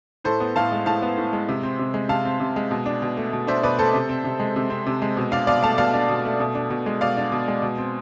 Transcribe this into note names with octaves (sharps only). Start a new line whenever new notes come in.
A2 A4 C5
B3
A2 F5 A5
G#3
A2 F5 A5
B3
A2
G#3
C3
C4
C3
G#3
C3 F5 A5
C4
C3
G#3
B2
D4
B2
A3
B2
D4 C5 E5
B2 B4 D5
A3 A4 C5
C3
C4
C3
G#3
C3
C4
C3
G#3
B2
D4 D5 F5
B2 D5 F5
A3 F5 A5
B2 D5 F5
D4
B2
A3
B2
D4
B2
G#3
B2 D5 F5
D4
B2
G#3
B2
C4